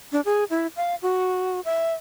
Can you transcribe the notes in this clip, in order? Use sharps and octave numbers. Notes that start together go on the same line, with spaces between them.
D4
G#4
E4
F5
F#4
E5